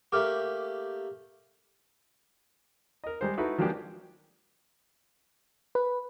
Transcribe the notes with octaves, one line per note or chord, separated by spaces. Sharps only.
A3 A#3 G4 D6 F6
A#4 D#5
G3 G#3 C5
D#4 E4 F#4 A4 B4
F3 F#3 G#3 A#3 D4 G4
B4